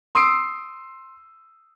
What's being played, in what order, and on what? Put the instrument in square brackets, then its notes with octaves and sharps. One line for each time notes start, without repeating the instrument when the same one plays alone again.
[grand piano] C6 D#6 E6 C7 D7